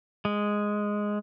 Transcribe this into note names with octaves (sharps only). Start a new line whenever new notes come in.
G#3